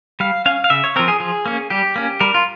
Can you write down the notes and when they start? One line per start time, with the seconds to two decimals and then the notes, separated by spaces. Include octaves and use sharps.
0.20 G3 F5
0.46 C#4 F5
0.64 F5
0.70 C#3 E5
0.84 C#5
0.96 F3 C4 A#4
1.08 G#4
1.20 F3 G#4
1.46 A#3 C#4
1.70 G3 G4
1.96 A#3 C#4
2.20 G3 A#4
2.34 F4